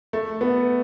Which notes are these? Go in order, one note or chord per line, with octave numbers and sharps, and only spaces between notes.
A3
B3